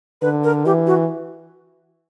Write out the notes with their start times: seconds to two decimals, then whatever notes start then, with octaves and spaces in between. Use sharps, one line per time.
0.22 D3 B4
0.44 A#4
0.66 E3 G4
0.87 F#4